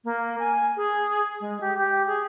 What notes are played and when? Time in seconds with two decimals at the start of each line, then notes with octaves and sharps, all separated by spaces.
0.04 A#3
0.39 G#5
0.77 G#4
1.41 G#3
1.61 G4
1.78 G4
2.07 G#4